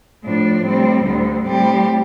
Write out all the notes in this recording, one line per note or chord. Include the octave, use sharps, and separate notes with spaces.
A2 F3 D4
A2 G3 C4
D2 D3 G3
A2 G3 C4 G4